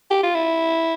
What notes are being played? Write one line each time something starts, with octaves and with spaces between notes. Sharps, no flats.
G4
F4
E4